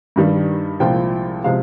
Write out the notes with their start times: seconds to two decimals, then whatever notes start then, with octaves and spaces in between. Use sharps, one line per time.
0.16 G2 D#3 G3
0.80 C2 A#2 F3 G#3 G5
1.44 C3 F3 G#3 F5